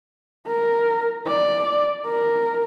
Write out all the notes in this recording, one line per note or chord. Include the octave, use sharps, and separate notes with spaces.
A#4
D5
A#4